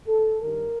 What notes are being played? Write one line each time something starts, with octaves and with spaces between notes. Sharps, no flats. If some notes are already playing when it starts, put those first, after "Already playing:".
A4
G2 D#3 G3 A#4